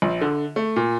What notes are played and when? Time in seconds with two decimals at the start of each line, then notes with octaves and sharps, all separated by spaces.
0.02 A#1
0.21 D3
0.56 A3
0.76 A#2